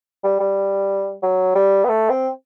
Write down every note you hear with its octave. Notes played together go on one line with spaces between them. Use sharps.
G3
G3
F#3
G3
B3
A3
C4